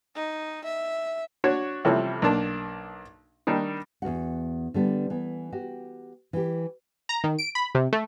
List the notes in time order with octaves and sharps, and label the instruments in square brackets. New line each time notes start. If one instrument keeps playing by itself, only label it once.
[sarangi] D#4
E5
[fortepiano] D4 F#4 C#5
C3 E3 F3 G3 A3 C#4
B1 A#3 D4 A5
D#3 G3 D4 D#4
[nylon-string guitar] E2 G#2 F#4 F#5
D3 G3 B3
E3 B3
F#4 G4
E3 G4
[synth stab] A#5
D#3
D7
B5
C3
A3